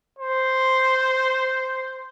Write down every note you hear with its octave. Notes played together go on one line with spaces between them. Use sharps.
C5